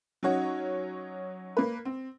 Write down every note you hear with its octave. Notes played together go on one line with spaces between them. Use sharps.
F#3 C#4 D#4 F#4 C#5
A#3 B4
C4